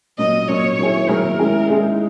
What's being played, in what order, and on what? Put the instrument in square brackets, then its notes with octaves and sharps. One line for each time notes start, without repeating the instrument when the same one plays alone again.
[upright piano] A#2 F#3 C#4 [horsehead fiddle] D#5
[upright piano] A#2 F#3 C#4 [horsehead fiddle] C#5
[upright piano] D#3 F#3 A#3 E4 G#4
[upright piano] D#3 F#3 A#3 E4 G#4 [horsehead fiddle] A#4
[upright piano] G#3 C#4 E4 G#4
[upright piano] G#3 C#4 E4 G#4 [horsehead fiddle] D#4